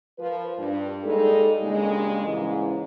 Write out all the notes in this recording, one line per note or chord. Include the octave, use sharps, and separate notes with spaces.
F3 A#4 B4
G2
G3 G#3 A#3 D#4 A4
G2 A#2 C#3 G#3
G#2 C#3 E3